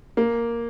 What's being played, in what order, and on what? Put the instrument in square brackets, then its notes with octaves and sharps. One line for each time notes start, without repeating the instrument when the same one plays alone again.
[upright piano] A#3